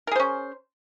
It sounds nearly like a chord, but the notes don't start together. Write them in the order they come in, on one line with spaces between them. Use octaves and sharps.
A#4 G#4 C5 C#4